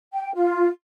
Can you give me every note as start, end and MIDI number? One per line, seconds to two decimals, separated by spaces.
0.13 0.33 79
0.34 0.67 65